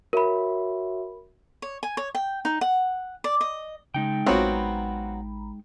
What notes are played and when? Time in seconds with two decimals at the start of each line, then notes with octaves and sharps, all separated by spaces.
0.13 F#4 A#4 C#5 E5 B5
1.62 C#5
1.83 G#5
1.97 C#5
2.15 G5
2.45 D#4
2.61 F#5
3.24 D5
3.41 D#5
3.94 C#3 G#3 D#4 G5
4.26 A1 F#3 B3 C4 F4 F#4 A#5 B5